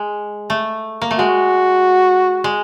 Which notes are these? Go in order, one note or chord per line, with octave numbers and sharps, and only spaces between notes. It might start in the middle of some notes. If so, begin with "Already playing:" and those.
Already playing: G#3
A3
A#3
A3
G#3 F#4
G#3